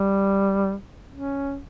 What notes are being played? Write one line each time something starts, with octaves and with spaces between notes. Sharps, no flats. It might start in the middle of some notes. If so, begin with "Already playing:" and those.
Already playing: G3
C#4